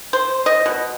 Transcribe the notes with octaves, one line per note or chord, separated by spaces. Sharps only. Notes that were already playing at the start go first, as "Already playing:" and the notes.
C5
D#5
B2